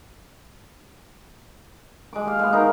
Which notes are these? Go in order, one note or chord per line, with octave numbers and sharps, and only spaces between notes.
G#3 D6
G4 F5
G#3 B3
D#4 E4 F#4 A#4